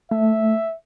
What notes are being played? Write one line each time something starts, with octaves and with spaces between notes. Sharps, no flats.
A3 E5